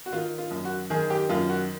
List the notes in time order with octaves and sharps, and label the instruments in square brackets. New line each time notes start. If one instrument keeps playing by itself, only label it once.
[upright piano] F#4
D#3 F4
F4
F#2
F#4
D#3 G#4
G4
F#2 F4
F#4